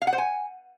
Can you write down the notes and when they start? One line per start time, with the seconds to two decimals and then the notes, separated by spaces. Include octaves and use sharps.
0.02 F5
0.07 F#5
0.13 C5
0.18 G#5